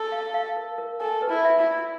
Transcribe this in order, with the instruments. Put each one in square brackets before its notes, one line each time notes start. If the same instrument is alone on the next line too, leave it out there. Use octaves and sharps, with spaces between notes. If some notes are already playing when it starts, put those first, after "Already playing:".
Already playing: [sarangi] A4
[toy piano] F5
F5
A#4
A#4
[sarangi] A4 [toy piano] G#5
[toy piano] B4
[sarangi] E4
[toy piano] E5
[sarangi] E4
[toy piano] B5